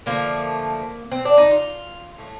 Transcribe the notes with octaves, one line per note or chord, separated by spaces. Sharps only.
D3 F3 A3 A#3
C4
D4
D#4
F4
A2 A3